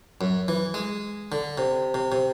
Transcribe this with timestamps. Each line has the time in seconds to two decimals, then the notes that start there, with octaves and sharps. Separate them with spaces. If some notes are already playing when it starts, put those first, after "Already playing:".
0.21 F#2
0.48 E3
0.74 G#3
1.32 D3
1.58 C3
1.94 C3
2.12 C3